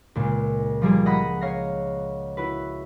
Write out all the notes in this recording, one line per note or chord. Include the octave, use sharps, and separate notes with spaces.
C#2 A#2 G#3
F3 G3 A#3 G#4
D#5 F#5 A#5 B5 D#6
C#5 F5 A#6
E4 F#4 B4